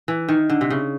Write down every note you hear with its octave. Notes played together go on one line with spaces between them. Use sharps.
E3
D#3
D3
C3
C#3